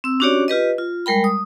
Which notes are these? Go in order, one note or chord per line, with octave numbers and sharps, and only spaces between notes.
C4 E6
C#4 D4 F#4 G4 C#5 D5
F4 G4 B4 D#5
F4
G3 G#3 A#4 G5 B5
D#6